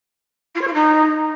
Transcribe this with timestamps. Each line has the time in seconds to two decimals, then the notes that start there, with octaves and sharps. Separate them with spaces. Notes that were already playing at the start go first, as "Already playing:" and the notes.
0.55 F4
0.61 C#5
0.67 F4
0.73 D#4